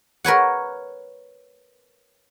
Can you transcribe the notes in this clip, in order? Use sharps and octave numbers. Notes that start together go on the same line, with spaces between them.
A#4 B4 C#5 F#5